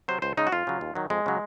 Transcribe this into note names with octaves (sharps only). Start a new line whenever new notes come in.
C3 F#3 C5
C#2 C5
C#3 G#3 D#4
F#4
F2 F4
C#3 F#3
D#2
D#3 F#3
F2 G#3
C#3 F#3